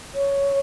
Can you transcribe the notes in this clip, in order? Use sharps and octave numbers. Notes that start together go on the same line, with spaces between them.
C#5